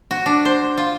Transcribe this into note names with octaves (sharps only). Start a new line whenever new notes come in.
F#4
D4
C5
F4